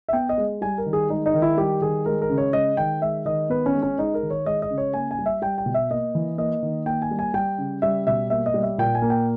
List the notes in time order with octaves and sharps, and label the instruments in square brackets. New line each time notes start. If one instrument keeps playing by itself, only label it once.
[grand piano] E5
B3 G5
D#5
G#3
G3 G#5
A#4
D#3
G#4
G#3 D#4
D#4
D#3
E4
G3 G4
D#3 G#4
G#3 A#4
A#4
C#3
C#5
G#3 D#5
D#3 G5
G#3 E5
D#3 D#5
B3 B4
C#4
G#3
C#4
G#3 D#4
A#4
D#3
C#5
G#3 D#5
D#5
C#3
C#5
A#3 G#5
G#5
G3
E5
G3 G5
G5
B2
E5
A#3 D#5
E3
A#3 D#5
D#3
A#3 G5
G#5
G3
G#5
G3 G5
C#3
G3 E5
B2 E5
A#3 E5
D#5
G3
E5
A#2 G5
G#5
A#3
G5